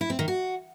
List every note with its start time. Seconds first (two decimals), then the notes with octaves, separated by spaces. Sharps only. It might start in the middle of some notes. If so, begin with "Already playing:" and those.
0.01 E4
0.10 C4
0.19 D#3
0.28 F#4